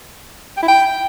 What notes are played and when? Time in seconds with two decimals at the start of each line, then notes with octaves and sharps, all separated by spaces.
0.57 G5
0.63 E4
0.68 G5